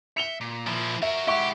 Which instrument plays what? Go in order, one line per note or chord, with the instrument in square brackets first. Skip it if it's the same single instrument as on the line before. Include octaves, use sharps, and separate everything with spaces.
[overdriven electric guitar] E5 [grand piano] C#7 F7 G7
[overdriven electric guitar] A#2
[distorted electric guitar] F3 E4
[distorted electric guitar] F#4 A#4 [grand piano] E5
[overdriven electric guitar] G#3 E4 [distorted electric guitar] G4 [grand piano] E5 F#5 C#6